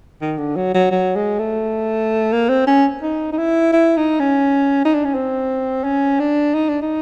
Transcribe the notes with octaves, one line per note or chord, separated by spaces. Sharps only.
D#3
D3
F#3
F#3
F#3
G#3
A3
A#3
C4
C#4
D#4
D#4
E4
E4
D#4
C#4
D#4
D4
C#4
C4
C#4
D4
D#4
D4
D#4